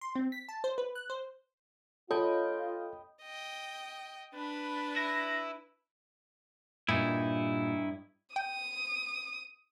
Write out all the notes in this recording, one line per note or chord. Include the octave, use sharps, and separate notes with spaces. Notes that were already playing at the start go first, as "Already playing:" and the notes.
C6
C4
B6
A5
C5
B4
F#6
C5
F4 A4 C#5 D#5 G5 B5
D#5 G5
D4 B4 B5
E4 A#6
G2 A#2 D#4 E4
G5 D#6